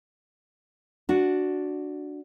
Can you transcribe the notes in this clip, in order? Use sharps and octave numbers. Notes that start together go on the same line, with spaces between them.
D4 F#4